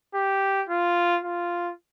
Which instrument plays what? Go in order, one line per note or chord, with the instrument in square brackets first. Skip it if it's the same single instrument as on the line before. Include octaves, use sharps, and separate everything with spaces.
[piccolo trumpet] G4
F4
F4